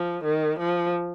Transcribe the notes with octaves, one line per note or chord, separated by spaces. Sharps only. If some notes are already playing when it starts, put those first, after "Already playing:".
Already playing: F3
D#3
F3